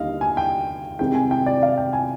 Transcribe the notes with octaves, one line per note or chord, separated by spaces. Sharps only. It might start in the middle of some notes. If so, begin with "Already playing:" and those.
Already playing: D#2 D3 G3 A#3 D#5 F5
G#5
G5
C2 C3 D#3 G#3 C4 G5
G#5
G5
D5
F5
G5
G#5